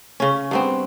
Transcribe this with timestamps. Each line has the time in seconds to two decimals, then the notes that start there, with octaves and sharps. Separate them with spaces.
0.20 C#3 C#4
0.51 G2 B3 C4